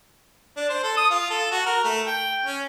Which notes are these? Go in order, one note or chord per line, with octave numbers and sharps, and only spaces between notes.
D4
C5
A4
D#6
F4
A4
F#4
A#4
A3
G5
C#4